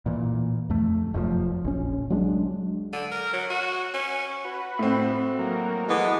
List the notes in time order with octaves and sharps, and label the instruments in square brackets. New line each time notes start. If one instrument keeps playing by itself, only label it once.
[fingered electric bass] A#2 E3
F2 A3
F1 F#2 A2 F3
A#1 C#4
F#3 G#3 D4
[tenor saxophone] D3
A#4
F#3
F#4
C#4
[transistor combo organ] F#4 B4
[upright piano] A2 C4
[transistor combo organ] F#3 A#3
[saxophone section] E3 G#3 B3 [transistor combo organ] A4